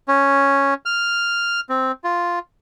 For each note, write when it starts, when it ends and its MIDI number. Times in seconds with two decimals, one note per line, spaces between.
0.08 0.74 61
0.86 1.60 89
1.69 1.92 60
2.04 2.39 65